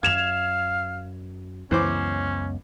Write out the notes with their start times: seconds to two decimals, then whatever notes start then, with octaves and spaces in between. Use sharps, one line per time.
0.03 F#2 F5 G#6 E7 F7
1.71 C#2 F#2 E3 B3 C#4 C5 D6